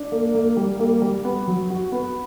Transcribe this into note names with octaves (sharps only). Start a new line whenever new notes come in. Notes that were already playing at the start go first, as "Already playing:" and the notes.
Already playing: D4
A#3
A#3
G3
A#3
G3
B3
F#3
F#4
B3